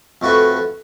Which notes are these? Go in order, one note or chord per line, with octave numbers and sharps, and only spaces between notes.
F2 A3 F#4 B4 C#6